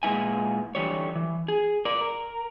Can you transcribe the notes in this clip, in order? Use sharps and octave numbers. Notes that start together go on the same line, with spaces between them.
A#2 G#3 B3 E4 G#5
D3 E3 G3 C#5
E3
G#4
A#4 D5
A#4